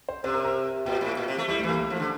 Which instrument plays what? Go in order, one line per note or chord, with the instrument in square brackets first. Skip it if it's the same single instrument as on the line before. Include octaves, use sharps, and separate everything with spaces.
[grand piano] C5
[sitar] C3 [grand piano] C5
[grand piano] A#4
A#4
[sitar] A#2 [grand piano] G4
[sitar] A2
A#2
C3
A3
[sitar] G3 [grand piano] E4
[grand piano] A3
[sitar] E3
[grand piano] A#3
A3
[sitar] F3
D3